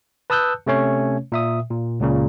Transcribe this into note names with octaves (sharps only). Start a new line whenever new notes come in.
B4 A5 D#6 E6 F#6 G6
C3 A3 C#4 C#5
A#2 E5 D#6
A#2
C#2 A#2 C#3